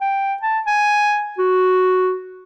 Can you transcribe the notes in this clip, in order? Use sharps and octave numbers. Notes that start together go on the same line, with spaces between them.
G5
A5
G#5
F#4